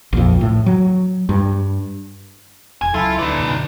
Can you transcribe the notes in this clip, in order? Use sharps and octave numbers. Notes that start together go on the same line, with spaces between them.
A#1 F2
A2
F#3
G2
E1 G#5
C#2 F#3 E4 F4 A4
D2 D#4 B4 D5
F#2 B2 D3